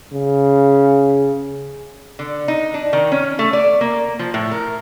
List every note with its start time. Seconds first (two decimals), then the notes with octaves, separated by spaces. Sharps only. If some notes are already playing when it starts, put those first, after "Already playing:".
0.13 C#3
2.19 D3
2.48 D#4
2.74 D4
2.93 D#3
3.12 C#4
3.39 A3
3.53 D5
3.81 A#3
4.19 F3
4.34 A2
4.51 A#4